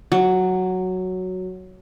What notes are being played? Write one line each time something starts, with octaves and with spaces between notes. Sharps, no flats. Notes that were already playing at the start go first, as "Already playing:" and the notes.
F#3